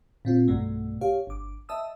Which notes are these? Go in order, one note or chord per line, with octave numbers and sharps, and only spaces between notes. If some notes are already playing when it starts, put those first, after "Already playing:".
A#2 C4 F4
B1 G2 B2 A3
G4 C#5 F5
G1 D6
D#5 E5 A5 D#6 E6